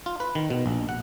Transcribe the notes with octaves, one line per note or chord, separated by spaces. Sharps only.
F4
B4
D#3
B2
A#1
F#5